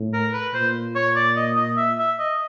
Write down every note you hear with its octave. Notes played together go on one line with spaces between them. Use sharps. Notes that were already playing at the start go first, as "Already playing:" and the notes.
Already playing: A2
A#4
B4
A#2 C5
C#5
D5
D#5
D#5
E5
E5
D#5